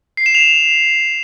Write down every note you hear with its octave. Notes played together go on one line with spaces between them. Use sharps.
C7
E7
F7